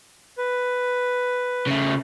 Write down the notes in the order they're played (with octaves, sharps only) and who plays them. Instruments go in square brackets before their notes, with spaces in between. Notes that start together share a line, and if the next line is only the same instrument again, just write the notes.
[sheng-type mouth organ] B4
[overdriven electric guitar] C#3 A3